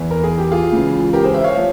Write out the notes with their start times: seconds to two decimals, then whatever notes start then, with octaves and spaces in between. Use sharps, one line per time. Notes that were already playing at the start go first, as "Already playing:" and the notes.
Already playing: E2 E3
0.11 A#4
0.23 G#4
0.38 G4
0.51 F4 G#4
0.72 C#2 C#3 E3
1.13 G4 A#4
1.24 G#4 C5
1.34 C5 E5
1.44 C#5 F5
1.57 F3